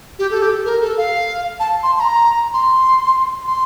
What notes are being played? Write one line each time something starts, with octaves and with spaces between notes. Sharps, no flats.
G4
A4
G4
A#4
A4
F5
A5
C6
C6
A#5
C6
C6